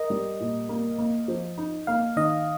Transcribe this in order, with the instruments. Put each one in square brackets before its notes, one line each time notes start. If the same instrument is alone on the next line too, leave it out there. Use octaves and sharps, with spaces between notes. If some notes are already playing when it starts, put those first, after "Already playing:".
Already playing: [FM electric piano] A#4 D#5
[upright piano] G3
A#2
A#3
A#3
F3
D#4
[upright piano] A#3 [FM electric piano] F5
[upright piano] D#3 [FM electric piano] D#5